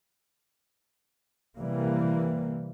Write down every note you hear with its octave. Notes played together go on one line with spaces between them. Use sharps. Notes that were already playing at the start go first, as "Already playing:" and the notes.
C3 E3 G3 A#3